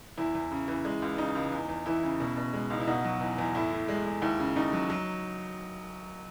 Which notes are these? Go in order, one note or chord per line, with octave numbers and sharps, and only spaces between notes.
E2 E4
E2
C#3
E3
G#3
C#2
C#3 D#4
C#2
E2
E2
E3 E4
C#3
B2
B2
G#3
C#2 D#4
E4
B2 D#4 F#4
F#3
E2
E2
A2 E4
A2
G#3
G#3
D#2 E4
C#3
D#2 D#4
F#3
F#3